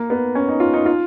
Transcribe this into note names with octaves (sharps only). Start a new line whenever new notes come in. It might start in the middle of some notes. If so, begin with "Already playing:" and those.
Already playing: A#3
B3
C#4
D#4
F4
D#4
F4